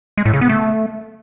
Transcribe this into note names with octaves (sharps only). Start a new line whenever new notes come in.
G#3
A2
C#3
B3
A3